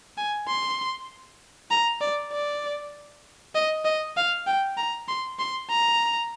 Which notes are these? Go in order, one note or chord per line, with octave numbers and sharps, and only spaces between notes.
G#5
C6
A#5
D5
D5
D#5
D#5
F5
G5
A#5
C6
C6
A#5